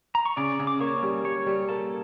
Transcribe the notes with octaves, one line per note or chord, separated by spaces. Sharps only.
A#5
C#6
C#3 D5 D6
C#3
D6
A#3 C#5 C#6
G3
G3 C#5 C#6
G3
A#3 A4 A5